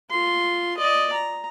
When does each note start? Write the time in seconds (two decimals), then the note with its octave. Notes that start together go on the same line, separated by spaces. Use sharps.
0.11 F4 C6
0.77 D5 D#5
1.13 A#5